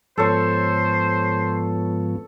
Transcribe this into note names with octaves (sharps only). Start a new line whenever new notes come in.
G#2 F3 B3 A4 C5 C#5